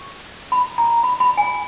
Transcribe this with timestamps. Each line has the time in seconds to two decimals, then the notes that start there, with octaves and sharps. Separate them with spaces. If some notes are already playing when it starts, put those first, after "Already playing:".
Already playing: C#6
0.52 B5
0.78 A#5
1.03 B5
1.20 B5
1.38 G#5